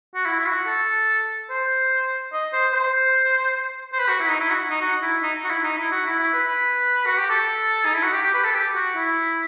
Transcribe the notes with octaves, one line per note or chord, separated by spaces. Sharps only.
F#4
E4
E4
F#4
A4
C5
D#5
C5
C5
C5
B4
F#4
E4
D#4
E4
F#4
D#4
F#4
E4
D#4
F#4
E4
D#4
E4
F#4
E4
E4
B4
B4
F#4
G4
A4
D#4
E4
F#4
G4
G4
B4
A4
G4
F#4
E4